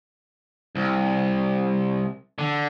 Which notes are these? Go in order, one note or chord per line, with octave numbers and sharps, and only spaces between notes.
C2
D3